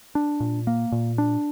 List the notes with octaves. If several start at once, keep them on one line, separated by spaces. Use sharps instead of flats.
D4
A#2
A#3
A#2
D4